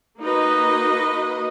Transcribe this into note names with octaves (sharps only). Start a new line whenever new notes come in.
A#3 D#4 F#4 B4 D#5